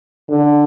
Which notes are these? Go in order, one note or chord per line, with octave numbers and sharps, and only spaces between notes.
D3